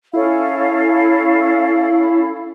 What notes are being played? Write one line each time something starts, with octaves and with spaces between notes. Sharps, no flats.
C#4 E4 A4 F5